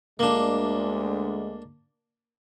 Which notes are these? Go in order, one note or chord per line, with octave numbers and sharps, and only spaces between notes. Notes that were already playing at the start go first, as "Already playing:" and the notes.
D2 G#3 A#3 D4